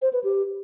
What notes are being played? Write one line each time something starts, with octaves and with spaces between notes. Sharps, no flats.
C5
B4
G4